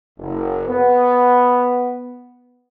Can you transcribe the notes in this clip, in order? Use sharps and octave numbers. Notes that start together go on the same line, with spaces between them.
F#1
B3